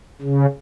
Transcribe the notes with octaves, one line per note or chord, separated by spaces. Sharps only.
C#3